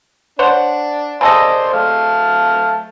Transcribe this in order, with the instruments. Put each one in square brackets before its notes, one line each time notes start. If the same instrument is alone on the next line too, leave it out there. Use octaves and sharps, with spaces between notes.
[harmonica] D4 [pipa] C5 C#5 F#5
[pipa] C#3 A4 D#5 [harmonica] C5 D5 C6
[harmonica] A3 F5 A5